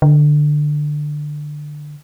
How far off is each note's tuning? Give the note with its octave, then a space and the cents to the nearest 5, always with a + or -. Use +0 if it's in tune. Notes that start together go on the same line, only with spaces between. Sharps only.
D3 +15